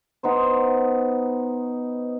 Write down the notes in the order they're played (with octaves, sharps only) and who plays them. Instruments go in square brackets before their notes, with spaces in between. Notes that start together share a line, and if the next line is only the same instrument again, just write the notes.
[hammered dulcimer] B3 D#4 C5